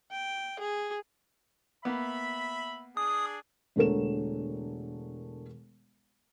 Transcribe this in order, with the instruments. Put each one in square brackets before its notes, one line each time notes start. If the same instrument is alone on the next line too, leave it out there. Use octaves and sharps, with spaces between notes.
[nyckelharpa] G5
G#4
[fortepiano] A#3 B3 [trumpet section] E5 B5
[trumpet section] D4 G#4 [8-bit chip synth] D#6
[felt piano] E1 D3 A3 A#4 E7